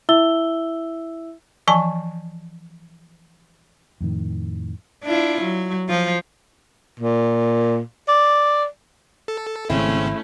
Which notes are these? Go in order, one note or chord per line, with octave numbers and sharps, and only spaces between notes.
E4 E5 E6 G7
E3 F3 G#5 A5 C#6
F2 A2 D#3
D4 E4 F4
F#3
F3 F4
A#2
D5
A4
G#1 C#3 A3 C4 C#4 E4